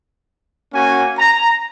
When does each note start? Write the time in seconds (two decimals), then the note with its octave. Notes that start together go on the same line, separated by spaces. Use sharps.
0.73 A#3 C#4 F#4 G#5
1.18 A#5